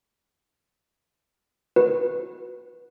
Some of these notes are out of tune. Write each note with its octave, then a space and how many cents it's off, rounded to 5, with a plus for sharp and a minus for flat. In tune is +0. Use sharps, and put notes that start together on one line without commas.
F#4 -15 B4 -10